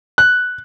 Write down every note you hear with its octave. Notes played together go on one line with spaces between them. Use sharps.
F#6